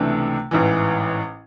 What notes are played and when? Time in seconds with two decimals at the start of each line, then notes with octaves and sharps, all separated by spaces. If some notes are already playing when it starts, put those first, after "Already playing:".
Already playing: C#2 C3 E3 A3 D4
0.51 A1 G#2 E3